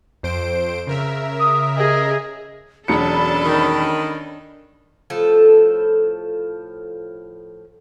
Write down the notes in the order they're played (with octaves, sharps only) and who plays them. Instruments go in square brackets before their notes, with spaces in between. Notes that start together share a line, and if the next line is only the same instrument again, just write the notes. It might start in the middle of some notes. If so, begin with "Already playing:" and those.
[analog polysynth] F2 C5 D7
C#3 A#4 E5
[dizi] D#6
[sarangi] G#4 [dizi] D#5
[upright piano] E1 F#3 C#7 [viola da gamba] C#4 D4 A4 [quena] B5
[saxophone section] D#3
[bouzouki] A2 F3 A4